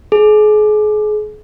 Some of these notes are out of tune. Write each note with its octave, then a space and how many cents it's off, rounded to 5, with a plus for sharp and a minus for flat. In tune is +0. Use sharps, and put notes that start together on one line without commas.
G#4 +35